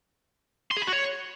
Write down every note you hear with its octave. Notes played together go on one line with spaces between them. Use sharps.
C6
G#4
B5
F#4
C#5